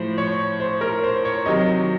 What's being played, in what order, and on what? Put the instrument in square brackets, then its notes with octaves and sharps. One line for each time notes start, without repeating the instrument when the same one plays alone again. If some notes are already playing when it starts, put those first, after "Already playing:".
Already playing: [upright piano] A2 F3 C5
C#5
C5
A#4
C5
C#5
C3 D#3 F#3 D#5